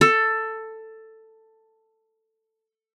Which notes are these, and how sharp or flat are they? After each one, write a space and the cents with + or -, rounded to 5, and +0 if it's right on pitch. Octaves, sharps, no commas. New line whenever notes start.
A4 +10